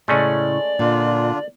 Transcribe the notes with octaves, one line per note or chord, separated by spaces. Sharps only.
A2 C#3 G#3 A3 C#4 D5
A#2 D3 D4 F4